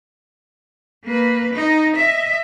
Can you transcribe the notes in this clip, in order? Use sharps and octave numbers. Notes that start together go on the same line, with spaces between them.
A#3 B4
D#4
D#5 E5